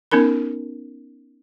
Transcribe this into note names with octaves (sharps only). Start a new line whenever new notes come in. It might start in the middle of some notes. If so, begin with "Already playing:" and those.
B3 C#4 D#4 A#4 B5